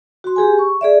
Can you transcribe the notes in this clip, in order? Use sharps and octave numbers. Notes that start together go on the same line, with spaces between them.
F#4 C6
G4 G#4 G#5
C#6
G#4 D5 E5